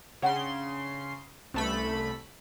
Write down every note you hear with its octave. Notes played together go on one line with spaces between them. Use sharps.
C#3 D4 F#5 G5 C6
C2 A3 C#4 B4 B5